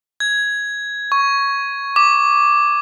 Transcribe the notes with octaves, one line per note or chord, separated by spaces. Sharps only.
G#6
C#6
D6